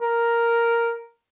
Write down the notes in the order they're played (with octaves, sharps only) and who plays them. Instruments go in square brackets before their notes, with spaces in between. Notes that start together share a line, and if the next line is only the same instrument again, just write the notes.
[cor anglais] A#4